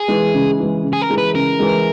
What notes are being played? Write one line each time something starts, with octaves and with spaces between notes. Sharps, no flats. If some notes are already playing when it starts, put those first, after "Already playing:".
Already playing: G#4
E3 G#3
C#3
E3 G#3
C#3
G#4
A#4
E3 G#3
B4
C#3 A#4
E3 G#3